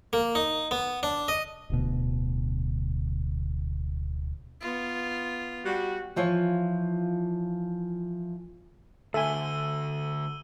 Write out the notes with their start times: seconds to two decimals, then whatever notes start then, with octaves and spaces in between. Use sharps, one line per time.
0.13 A#3
0.35 D#4
0.71 B3
1.03 D4
1.28 D#5
1.70 D1 D2 B2
4.61 B3 F4
5.65 G3 F#4
6.16 E3 F3 F4 C#5
9.14 D2 D3 A4 E5 G#5 E6 D#7 G7